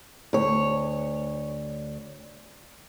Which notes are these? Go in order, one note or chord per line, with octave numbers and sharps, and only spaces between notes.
D2 C#5